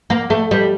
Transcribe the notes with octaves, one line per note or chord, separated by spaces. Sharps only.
A#3
A3
G3